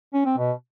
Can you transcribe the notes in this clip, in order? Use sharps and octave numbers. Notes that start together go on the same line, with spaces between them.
C#4
C4
B2